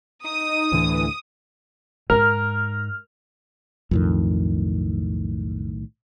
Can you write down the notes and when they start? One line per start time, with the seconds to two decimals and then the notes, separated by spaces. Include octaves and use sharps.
0.24 D#4 D#6
0.72 D2 A2 D3 E3
2.10 G#2 A#4 F6
3.91 B1 F2 A2 D#3